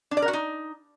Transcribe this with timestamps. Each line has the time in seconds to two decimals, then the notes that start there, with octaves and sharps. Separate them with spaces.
0.11 D4
0.17 D5
0.22 A#4
0.28 F#4
0.33 D#4